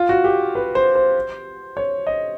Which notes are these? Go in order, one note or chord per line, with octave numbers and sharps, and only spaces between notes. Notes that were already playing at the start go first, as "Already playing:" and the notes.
Already playing: F4
F#4
G4
B4
C5
C5
C#5
D#5